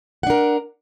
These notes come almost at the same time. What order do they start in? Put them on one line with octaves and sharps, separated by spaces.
F#5 D4 A#4